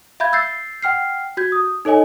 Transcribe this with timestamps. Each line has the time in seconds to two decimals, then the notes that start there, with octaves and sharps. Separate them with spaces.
0.20 E5 F5 B5 G6 G#6
0.33 E6 G6 A6 C7
0.82 F#5 G5 F6 C7
1.37 F#4 G6 G#6
1.52 D#6
1.85 D#4 A4 C#5 D#5 G#5